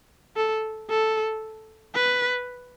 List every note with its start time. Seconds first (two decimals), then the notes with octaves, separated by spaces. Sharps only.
0.37 A4
0.90 A4
1.95 B4